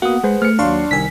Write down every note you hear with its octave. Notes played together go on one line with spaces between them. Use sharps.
A#3 B3 F#4 F#5 D#6
G#3 G#4 B4 C5
A3 F6 C#7
D#2 F#3 D4 F5 C6 C#6
C2 D#3 G#5 E6 B6